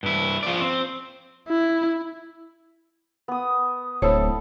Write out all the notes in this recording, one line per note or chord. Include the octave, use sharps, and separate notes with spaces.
G2 E4
F3 D5
C4
E4
B3 D#6
D1 E4 A4 C5 C#5 A5